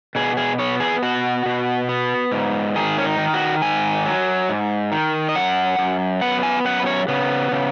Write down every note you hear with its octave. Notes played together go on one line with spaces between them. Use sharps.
B2 G#4
G#4
B3 C#5
G#4
B2 F#4
B2
B3
G#2
D#3 G#4
C#4
D#4
D#3
F#4
G#2 G#5
F#3
G#2
D#3
D#5
F#2 F#5
F#2
B3 F#5
G#5
F#2 F#5
B4
C#5
C#3 B3
C#3